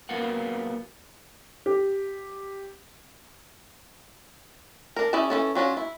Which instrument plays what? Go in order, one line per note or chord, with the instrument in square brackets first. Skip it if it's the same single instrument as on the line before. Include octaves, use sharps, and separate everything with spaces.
[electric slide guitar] F#3 A#3 B3 F4 A#4 F#5
[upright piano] G4
[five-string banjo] D4 A#4
C#4 E4 G#4 D5 A5
E3 F#3 C#4 A4
F#3 C#4 D4 F4
E4